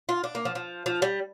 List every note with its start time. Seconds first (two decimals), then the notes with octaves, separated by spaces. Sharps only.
0.09 F4
0.24 D4
0.35 A#3
0.45 F3
0.55 F3
0.86 F3
1.02 G3